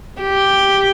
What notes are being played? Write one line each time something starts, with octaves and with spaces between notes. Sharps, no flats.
G4